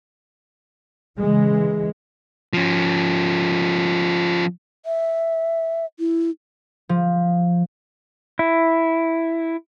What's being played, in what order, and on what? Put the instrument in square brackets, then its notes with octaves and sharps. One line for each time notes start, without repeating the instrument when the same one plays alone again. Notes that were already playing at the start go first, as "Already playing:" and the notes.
[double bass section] C#3 E3 G#3
[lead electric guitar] F3 C#4
[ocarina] E5
E4
[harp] F3
[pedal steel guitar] E4